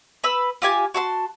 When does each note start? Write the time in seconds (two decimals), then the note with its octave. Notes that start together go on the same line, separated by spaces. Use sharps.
0.24 B4 B5 E6
0.62 F4 G4 G#5
0.94 F#4 A5 C6